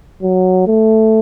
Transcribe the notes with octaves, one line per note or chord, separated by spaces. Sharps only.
F#3
A3